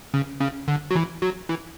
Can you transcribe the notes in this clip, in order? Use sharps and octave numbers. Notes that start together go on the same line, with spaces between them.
C#3
C#3
D3
F#3
E3
F#3
E3